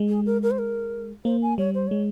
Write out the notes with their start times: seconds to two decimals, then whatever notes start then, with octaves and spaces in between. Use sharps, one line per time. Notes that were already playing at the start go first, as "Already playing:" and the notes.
Already playing: G#3
0.09 G#4
0.26 A#4
0.43 A#4
0.51 C5
0.59 A#4
1.25 A#3 C5
1.42 G#5
1.58 G3 C#5
1.75 C5
1.87 G#3 C#5